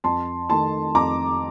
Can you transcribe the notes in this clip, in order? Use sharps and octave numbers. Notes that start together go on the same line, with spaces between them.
F2 A5 C6
D#3 A3 A5 C6
F2 A#5 D6